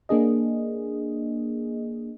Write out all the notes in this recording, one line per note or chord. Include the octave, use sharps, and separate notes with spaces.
A#3 D4 G#4 D#5